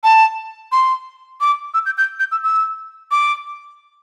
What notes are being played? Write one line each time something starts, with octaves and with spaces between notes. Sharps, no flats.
A5
C6
D6
E6
G6
G6
G6
E6
E6
D6